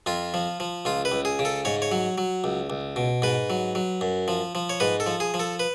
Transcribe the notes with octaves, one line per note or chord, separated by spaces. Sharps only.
F2 F4
F3
F3
C#2 F4
B4
C#2
G#4
C#3
A4
G#2 C#5
C#5
F#3
F#3
C#2
C#2
B2
G#2 B4
F#3
F#3
F#2
F3
F3
C#5
G#2 B4
A4
F3
G#4
F3
A4
B4